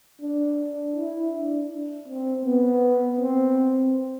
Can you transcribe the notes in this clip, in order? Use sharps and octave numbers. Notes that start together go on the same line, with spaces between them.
D4
E4
D4
C4
B3
C4